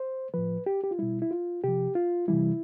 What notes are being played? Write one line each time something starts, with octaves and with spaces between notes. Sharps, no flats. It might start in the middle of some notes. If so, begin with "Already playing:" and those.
Already playing: C5
A2 F3 B4
G4
G4
F4
B2 G3 E4
E4
F4
C3 F3 G4
F4
C3 E3 G3 E4